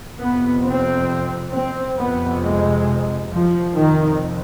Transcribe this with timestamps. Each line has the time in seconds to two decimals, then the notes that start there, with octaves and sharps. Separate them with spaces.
0.18 F2 C3 B3
0.63 C4
1.53 C4
1.96 F2 C3 B3
2.41 G#3
3.30 F3
3.75 F2 C3 D#3